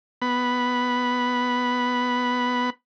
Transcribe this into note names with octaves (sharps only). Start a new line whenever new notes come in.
B3 B5